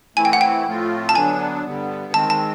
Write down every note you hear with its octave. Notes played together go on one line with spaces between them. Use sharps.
E3 A3 C4 E4 G#5
G5
F#5
G5
A2 F3 A3 C4 F4
A5
D3 F#3 B3 D4 G#5
G2 D3 G3 B3
D#3 G#3 C4 A5
A5